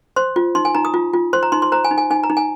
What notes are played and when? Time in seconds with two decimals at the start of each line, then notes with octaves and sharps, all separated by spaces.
0.16 C5 C6
0.36 F4
0.55 D#4 C6
0.65 G#5
0.75 D#4 A#5
0.85 D#6
0.94 F4
1.13 F4
1.33 C5 C6
1.43 A#5
1.52 D#4 C6
1.62 C6
1.72 C5 A#5
1.85 G#5
1.91 D#4
1.98 G#5
2.11 D#4 G#5
2.24 A#5
2.30 D#4
2.37 G#5